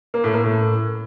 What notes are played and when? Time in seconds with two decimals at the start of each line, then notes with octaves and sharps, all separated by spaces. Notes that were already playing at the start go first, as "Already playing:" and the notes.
0.14 A#3
0.24 A2
0.34 A#3
0.44 A2